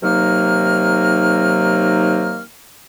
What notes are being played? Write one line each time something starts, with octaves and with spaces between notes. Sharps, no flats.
C3 D#3 F#3 A#3 D#4 F6